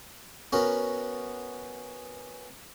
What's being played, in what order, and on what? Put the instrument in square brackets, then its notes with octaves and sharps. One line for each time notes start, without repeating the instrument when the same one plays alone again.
[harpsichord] B3 C#4 F#4 A#4